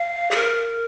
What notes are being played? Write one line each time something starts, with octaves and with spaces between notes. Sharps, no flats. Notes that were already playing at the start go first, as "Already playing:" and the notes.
Already playing: F5
G#4
A#4